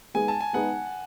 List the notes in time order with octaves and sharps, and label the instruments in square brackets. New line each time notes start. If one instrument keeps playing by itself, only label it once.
[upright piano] G#3 B3 D#4 G#4 [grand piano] G#5
[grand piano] A5
G#5
[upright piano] G#3 B3 D#4 G#4 [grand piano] F#5